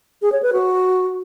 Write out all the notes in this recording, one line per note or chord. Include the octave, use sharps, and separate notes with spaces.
G#4
C#5
B4
F#4